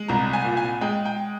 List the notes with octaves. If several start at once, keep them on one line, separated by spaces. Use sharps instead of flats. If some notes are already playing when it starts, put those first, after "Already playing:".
Already playing: G#3
C2 A#5
G#5
A#2
G#5
G#3 G5
G5